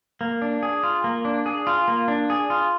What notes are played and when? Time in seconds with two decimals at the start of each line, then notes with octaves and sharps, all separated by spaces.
0.21 A#3
0.42 D4
0.63 G#4
0.83 F4
1.04 A#3
1.25 D4
1.46 G#4
1.67 F4
1.88 A#3
2.08 D4
2.30 G#4
2.50 F4